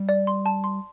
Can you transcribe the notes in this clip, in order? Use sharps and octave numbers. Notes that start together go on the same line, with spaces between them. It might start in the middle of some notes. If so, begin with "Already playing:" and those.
Already playing: G3
D5
C6
A5
C6